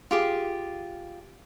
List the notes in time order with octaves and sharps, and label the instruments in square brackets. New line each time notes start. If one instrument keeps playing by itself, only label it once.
[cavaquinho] F4 G4 G#4